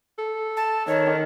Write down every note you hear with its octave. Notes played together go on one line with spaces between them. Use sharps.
A4
A5
D#3 C#5